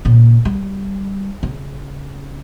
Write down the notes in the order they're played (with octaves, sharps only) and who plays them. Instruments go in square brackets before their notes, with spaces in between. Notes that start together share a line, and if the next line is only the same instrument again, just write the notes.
[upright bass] A#2 C#3
G3
C#3